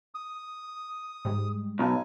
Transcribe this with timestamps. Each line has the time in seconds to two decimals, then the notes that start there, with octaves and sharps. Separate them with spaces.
0.15 D#6
1.25 G#2 G3 G#3
1.79 B1 D#4 G#5